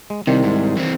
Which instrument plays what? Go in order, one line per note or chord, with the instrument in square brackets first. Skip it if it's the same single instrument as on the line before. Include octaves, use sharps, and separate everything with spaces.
[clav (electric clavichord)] G#3
[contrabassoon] C2 [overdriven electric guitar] C3 [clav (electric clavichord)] D#3
[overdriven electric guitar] G#2
E3 C4